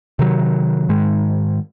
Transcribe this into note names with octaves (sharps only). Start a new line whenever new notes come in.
C3 D#3 F#3
G#2 D#3 G#3